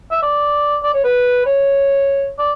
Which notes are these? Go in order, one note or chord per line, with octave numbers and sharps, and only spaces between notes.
E5
D5
D5
C#5
B4
C#5
D5